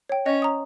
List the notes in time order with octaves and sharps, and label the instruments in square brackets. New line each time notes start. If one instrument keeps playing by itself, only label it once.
[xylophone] C#5 G5
[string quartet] C#4 [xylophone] D#5
[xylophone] A#5 D#6